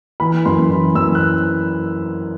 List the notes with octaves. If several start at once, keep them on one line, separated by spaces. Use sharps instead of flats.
E3 B5
F#2 C6
E3
F#2 E6
F#6